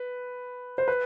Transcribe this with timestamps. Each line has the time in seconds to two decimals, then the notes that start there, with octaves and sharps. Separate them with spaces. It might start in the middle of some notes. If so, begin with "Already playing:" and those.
Already playing: B4
0.78 C5
0.88 B4